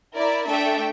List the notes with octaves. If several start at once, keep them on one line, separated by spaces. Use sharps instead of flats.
E4 A#4 D5
A3 D4 A4 E5 G5